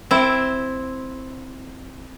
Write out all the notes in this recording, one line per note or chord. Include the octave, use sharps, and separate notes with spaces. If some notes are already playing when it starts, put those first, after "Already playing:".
C4 E4